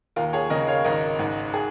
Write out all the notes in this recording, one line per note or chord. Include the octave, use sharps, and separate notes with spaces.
D#2 F4 A#4
G#4 C#5
C#3 A#4 D#5
C#5 F5
G#1 A#4 D#5
G#2
G#4